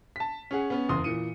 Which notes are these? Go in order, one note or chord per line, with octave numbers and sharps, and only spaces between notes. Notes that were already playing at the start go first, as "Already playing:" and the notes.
A5 B6
C#4 G#4 F#5
B3 C#4
F#1 E2 C6 D#6
A#2 E3 C#7 D#7